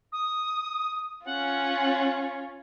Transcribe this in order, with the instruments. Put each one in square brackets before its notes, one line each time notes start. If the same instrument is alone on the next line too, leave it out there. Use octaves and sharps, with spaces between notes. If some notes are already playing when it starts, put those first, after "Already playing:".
[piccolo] D#6
[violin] C#4 F4 [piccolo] F#5